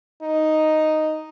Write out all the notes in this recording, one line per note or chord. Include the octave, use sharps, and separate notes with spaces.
D#4